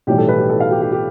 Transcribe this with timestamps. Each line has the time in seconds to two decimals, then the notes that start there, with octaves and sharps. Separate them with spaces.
0.07 B1 A2 E3 G3 G4
0.18 A4
0.29 B4
0.39 G4
0.50 A4
0.60 F5
0.71 G4
0.82 G4
0.92 G4